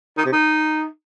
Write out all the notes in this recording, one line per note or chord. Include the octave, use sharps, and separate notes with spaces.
D#4
C3
D#4